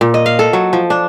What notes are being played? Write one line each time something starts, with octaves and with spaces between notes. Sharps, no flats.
A#2
D#5
F5
A4
F#3
F3
D4